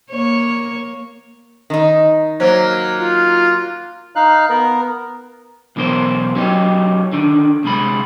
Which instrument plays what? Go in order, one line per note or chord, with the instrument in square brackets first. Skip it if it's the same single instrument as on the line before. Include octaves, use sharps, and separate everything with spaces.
[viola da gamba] A#3 C#5
[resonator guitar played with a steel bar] D#3 D#4
[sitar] F#3 A#3 [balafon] C5
[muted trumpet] F4
[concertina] D#4 F5 F#6
B3 A#4
[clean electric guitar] B1 E3 B3 A#4 C5
F#3 C#4 D#4 G4
D3 D#3
D2 C3 G#3 B5